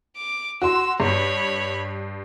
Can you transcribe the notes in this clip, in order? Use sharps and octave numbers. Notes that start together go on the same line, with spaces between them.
D6
F#4 C6 E6
G2 C#5 B5